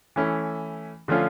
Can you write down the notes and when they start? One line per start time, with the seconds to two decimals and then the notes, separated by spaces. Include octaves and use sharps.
0.16 E3 A3 C#4 E4
1.08 D3 F3 A3 C#4 F4